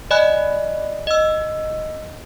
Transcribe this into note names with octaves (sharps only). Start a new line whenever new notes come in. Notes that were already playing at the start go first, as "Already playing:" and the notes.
D5 D#5 G#5 B5 F#6
D#5 E6